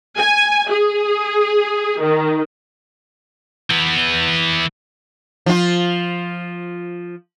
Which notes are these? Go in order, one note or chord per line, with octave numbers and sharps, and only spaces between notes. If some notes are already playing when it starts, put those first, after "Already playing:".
G#5
G#4
D#3
E3 B3
F3 F4